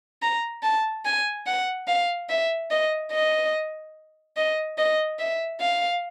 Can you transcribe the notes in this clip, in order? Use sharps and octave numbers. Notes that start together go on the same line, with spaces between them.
A#5
A5
G#5
F#5
F5
E5
D#5
D#5
D#5
D#5
E5
F5